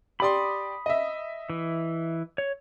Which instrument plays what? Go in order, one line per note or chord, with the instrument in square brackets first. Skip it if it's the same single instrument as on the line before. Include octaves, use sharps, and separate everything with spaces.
[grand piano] G4 D5 C6 [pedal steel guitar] B5 D#6
[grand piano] D#5 E5
[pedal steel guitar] E3
C#5